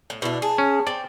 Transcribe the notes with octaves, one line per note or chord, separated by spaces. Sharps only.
A2
B2 D4 E4
G#4 A5
C#4
C4 D5